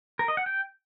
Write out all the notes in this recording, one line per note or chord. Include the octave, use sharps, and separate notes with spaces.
A#4
D#5
F#5
G5